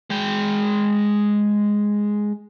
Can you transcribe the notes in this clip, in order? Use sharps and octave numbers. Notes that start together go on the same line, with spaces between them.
G#3 G5